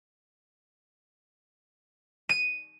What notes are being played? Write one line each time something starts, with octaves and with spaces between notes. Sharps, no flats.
D#7